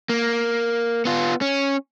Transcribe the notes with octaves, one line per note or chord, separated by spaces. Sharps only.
A#3
B3 F4
C#4